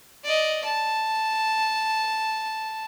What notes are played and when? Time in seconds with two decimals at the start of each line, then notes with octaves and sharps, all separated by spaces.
0.24 D5 D#5
0.65 A5